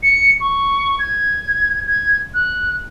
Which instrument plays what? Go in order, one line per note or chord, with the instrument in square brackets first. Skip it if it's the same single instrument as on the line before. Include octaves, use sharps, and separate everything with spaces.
[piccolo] C#7
C#6
G#6
G#6
F#6